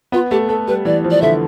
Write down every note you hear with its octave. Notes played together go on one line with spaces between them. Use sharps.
B3 F4
A3 G4
A3 A4
G3 B4
E3 D5
F3
D5
D3 E5